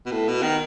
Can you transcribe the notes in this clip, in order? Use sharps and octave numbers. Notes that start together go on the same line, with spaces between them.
B2
A2
B2
D#3